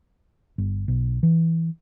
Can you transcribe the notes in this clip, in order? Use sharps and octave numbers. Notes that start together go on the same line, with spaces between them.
G1
B1
E3